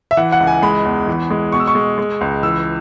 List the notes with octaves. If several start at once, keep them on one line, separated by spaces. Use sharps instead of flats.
E5
E3 F#5
F#5
C#2
G#5
G#3 B5
E2
E3
G#3
B2 C#6
E6
C#6
G#3
G#3
C#2
E3 E6